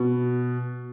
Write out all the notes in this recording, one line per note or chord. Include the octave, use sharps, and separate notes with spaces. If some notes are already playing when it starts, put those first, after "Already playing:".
Already playing: B2